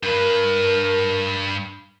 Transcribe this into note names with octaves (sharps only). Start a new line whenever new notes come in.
G2 A#4 B4